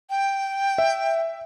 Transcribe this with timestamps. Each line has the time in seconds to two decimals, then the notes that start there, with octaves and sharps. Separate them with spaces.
0.10 G5
0.78 E5